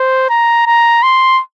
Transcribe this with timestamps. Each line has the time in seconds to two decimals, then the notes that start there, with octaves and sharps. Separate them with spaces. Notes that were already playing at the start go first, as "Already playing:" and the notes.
Already playing: C5
0.30 A#5
0.66 A#5
1.03 C6